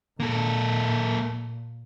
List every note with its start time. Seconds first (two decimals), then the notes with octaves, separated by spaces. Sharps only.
0.20 A#2 A#3 A4